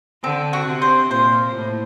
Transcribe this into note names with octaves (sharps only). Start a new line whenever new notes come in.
D3 C4
F#4
C3
C5
A#2 C5
A2